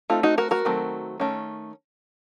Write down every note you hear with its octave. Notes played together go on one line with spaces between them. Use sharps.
A3 C4 D#4 F4
D#4 F#4
F#4 A#4
F#4 A#4
D#3 F#3 A3 C4
D#3 A3 C#4